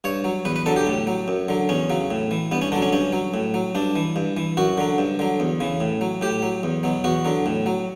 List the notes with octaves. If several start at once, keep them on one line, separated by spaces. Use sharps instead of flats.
G2 C#5
F#3
E2 B4
B4
D3 F#3 A4
G4
A2
F#3
F#2
D3 F#3
E2 C#4
C#3 F#3
A2
E3
G2 B3
C#4
D3 F#3 D4
C#4
G2 C#4
F#3
A2
F#3
G2 D4
E3
G2
E3
F#2 F#4
D3 F#3
G2
D3 F#3
E2
C#3 E3
A2
F#3
A2 G4
F#3
E2
B2 F#3
E2 F#4
D3 F#3
A2
F#3